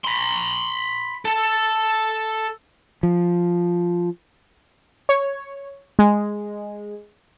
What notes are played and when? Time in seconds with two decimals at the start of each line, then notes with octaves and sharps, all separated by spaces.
0.04 B5 C6
1.25 A4
3.03 F3
5.09 C#5
5.99 G#3